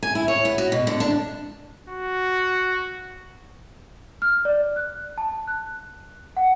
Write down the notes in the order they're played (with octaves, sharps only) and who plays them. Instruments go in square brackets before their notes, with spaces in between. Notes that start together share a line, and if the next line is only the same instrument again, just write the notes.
[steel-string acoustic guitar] G#5
E4
C#5
B3
F#4
B2
D3
D4
[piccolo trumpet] F#4
[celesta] F6
D5
F#6
A5
F#6
F#5